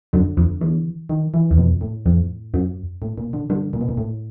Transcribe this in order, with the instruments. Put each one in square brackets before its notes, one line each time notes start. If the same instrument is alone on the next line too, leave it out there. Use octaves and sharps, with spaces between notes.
[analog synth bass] F#2 [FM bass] D3
[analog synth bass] F2
E2
[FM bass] D#3
E3
[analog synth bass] E2
[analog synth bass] F2 [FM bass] B2
[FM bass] A2
[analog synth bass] F2
F#2
[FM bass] A2
A#2
D3
[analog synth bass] G2 [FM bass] D3
[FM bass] A#2
B2
A#2
A2